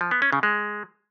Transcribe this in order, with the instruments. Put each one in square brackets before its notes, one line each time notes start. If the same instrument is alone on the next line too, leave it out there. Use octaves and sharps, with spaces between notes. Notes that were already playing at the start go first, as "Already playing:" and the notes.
[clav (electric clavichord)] F3
B3
C#4
C#3
G#3